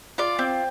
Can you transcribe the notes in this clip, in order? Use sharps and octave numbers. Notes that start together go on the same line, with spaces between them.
F4 D5
C4